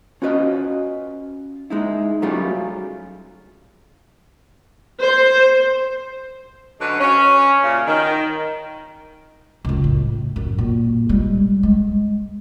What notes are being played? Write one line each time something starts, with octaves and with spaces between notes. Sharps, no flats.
C#4 F4 F#4 B4 D#5
G#3 D#4 E4
F#3 G3 A3 C#4 F4 G#4
C5
D3 F#3 G#3 C#4 B4
C#4
F#2 A#2 C#3
D#3
C#2 F#2
A2
F#2
A#2
G3 G#3
G#3